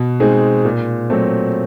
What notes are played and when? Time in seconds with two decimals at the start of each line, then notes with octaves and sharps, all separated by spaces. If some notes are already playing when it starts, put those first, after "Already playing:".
Already playing: B2
0.20 G#3 C4 D#4 G#4
0.65 A#2
1.10 F#3 A3 C4